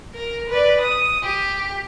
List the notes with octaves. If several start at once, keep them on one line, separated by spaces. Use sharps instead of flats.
A#4
B4 D5
D#6
G4